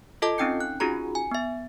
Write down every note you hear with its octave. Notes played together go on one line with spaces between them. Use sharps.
F4 A4 D#5 A5 D6
C4 C#4 D#4 G5 G6 C#7
F#6
C#4 D#4 F4 F#4 G#4 A#5
G#5
B3 E5